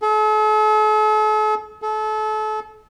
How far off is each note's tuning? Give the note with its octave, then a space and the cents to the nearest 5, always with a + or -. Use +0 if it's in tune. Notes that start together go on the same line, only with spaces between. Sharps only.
A4 -45
A4 -35